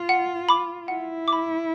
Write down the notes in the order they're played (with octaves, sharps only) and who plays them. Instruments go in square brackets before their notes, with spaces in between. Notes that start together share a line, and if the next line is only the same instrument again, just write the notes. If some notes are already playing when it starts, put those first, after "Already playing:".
Already playing: [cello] F4
[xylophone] F#5
B5 D6
[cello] E4 [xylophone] F#5
[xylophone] B5 D6